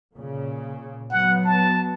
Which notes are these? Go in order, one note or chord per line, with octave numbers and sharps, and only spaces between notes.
A#2 C#3
F#3 B3 F#5
A5